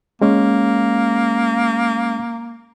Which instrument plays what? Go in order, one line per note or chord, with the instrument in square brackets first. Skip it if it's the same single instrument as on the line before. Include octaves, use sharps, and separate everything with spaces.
[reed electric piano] G#3 C#4 [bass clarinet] A#3